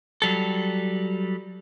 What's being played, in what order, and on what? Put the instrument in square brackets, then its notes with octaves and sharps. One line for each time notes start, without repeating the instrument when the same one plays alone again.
[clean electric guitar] F#3 G3 A4